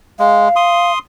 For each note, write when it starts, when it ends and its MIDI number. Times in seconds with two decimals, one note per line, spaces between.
0.19 0.49 56
0.19 0.92 77
0.56 0.99 84
0.56 0.99 87